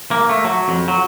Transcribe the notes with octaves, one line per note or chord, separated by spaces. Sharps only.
A#3
A3
F#3
F2
F#3